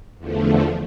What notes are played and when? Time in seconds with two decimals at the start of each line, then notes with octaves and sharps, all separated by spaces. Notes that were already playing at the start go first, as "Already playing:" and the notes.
0.18 E2 D3 F3 A3